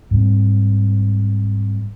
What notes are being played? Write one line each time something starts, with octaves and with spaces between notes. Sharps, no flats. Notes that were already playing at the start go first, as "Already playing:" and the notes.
G#2 G3 A3 C4